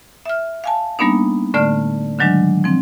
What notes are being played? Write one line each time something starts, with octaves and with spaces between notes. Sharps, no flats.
E5 F6
F5 G#5 A5
G3 A#3 B3 D4 D#4
A2 D3 A3 D5 F6
D3 D#3 F#3 G#3 D4
F3 C4